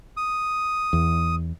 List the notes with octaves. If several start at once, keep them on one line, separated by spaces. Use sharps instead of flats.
D#6
E2